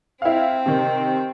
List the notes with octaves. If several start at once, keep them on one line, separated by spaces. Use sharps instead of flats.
C4 E4 F5
C3 D#3